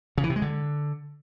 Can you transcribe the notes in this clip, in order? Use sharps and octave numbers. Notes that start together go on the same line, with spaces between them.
C#3
E3
C3
G#3
D3